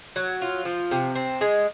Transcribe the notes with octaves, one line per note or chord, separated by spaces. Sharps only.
F#3
F4
F3
C3
C4
G#3